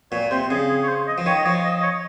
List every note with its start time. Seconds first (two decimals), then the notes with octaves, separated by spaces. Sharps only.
0.12 A#2 C#5
0.31 C3 C5
0.50 C#3 G#4
0.69 G#4
0.83 C#5
0.88 C5
1.07 D#5
1.18 F3
1.26 D#3 C#5
1.37 D#5
1.46 F3 C#5
1.65 D#5
1.80 D#5
1.83 C#5